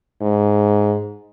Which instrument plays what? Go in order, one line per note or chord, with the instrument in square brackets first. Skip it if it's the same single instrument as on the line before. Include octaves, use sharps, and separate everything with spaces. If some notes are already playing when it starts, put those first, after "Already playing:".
[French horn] G#2